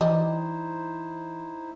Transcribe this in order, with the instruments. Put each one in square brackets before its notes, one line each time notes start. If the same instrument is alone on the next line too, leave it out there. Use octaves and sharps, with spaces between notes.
[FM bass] E3 [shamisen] G3 D#5 [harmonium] D#4 E4 C5